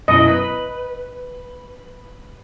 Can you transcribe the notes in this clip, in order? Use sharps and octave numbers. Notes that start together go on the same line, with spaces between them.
F#2 B2 E4 D#5
B4